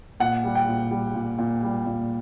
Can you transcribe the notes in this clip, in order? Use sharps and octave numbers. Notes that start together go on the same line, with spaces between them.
A#2 F#5
G3
G5
A#2
G3
A#2
A#2
G3
A#2